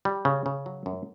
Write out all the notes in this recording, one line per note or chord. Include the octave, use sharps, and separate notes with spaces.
G3
C#3
C#3
F#3
F#2